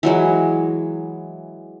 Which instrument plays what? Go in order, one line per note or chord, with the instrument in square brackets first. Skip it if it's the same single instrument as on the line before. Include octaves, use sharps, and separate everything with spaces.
[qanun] E3 F#3 G#3